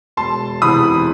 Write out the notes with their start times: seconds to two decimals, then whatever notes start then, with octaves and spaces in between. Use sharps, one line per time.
0.17 E1 A5 C6
0.62 E2 C3 E3 B5 D#6